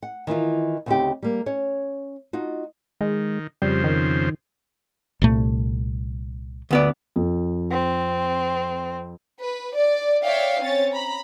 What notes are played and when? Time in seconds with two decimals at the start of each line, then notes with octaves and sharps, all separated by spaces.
0.03 F#5
0.27 D#3 E3 E4 F4
0.86 D2 C#3 C4 C#4 D#4 G4
1.23 G3 A#3
1.46 C#4 C#5
2.33 D#4 F4 F#4
3.01 D#3 G#3
3.62 F2 C#3 G3 C5
3.84 D#3
5.22 C2 A#2 A3
6.71 D2 B3 D5
7.16 F2
7.71 C4
9.38 B4
9.75 D5
10.23 C#5 D5 E5 F5 G5
10.59 C4 C#4 C#5 A6
10.91 A#5 B5